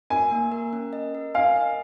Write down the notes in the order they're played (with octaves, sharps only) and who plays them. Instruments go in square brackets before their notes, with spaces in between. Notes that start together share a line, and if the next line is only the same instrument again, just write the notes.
[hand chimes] A#4 [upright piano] G#5
[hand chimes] A#3
A#4
C#4
D#5
A#4
[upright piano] F5 [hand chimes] G#5
[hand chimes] D#5